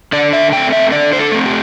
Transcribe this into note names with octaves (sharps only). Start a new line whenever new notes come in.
D3 D5
E5
A3 C4 G5
E5
D3 D5
C5
A4
A3 C4
G4